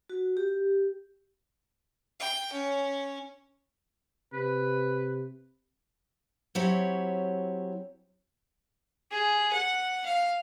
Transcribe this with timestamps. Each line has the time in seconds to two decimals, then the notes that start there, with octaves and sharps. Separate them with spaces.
0.09 F#4
0.37 G4
2.19 G5
2.52 C#4
4.33 C3 B4
6.55 F#3 C4 E4 G4 C#5
9.11 G#4
9.53 F#5
10.06 F5